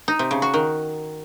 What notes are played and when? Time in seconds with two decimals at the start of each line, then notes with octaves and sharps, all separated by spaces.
0.08 D#4
0.19 C3
0.31 C#3
0.42 F#4
0.54 D#3